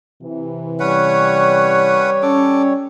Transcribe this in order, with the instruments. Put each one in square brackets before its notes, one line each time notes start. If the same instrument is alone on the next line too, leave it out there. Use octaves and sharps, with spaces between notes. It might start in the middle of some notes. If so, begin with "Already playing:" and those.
[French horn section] C3 E3
[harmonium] G3 C#5 [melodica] C#4 B4 F#5
[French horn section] C#4 [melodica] A4 D6